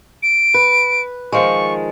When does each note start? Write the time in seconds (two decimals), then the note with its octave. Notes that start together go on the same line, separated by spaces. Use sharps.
0.23 D7
0.54 B4
1.32 D#3 F3 G#3 C#6